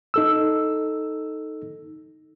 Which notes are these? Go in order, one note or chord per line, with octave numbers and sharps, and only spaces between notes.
D#4 A4 E6